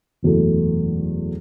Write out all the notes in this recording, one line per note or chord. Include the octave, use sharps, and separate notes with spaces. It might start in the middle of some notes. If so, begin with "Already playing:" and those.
F#1 E2 B2 A3